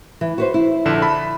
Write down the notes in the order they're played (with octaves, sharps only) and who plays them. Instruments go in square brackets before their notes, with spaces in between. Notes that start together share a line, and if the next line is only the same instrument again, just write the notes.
[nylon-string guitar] E3
F#4 B4 C5
E4
[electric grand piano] A#1 D3 E7
A5 B5